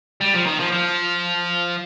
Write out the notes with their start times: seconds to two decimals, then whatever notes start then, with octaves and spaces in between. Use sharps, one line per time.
0.21 G3
0.34 F3
0.46 D#3
0.60 F3
0.72 F3